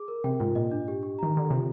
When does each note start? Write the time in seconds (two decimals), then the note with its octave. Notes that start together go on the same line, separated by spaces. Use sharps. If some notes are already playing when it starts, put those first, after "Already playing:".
Already playing: G#4 D6
0.08 A#4
0.24 C3 G5
0.40 G#2 F4
0.55 A#2 D#5
0.71 D4
0.88 G4
1.03 G4
1.19 D#3 A#5
1.35 D3 G4
1.50 C3 F4